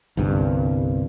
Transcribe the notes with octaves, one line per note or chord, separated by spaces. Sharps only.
G1 C2 G2